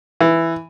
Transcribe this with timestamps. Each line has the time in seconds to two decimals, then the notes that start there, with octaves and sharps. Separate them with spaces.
0.21 E3